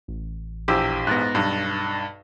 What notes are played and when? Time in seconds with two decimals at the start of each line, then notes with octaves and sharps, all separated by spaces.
0.08 A1
0.68 A#1 E2 G4 D6 E6
1.07 G#2 B3 F#6 A6 A#6
1.35 B1 G2